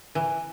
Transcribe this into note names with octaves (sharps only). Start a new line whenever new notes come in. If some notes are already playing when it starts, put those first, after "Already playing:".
E3